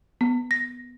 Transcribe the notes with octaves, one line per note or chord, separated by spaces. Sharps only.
B3
A#6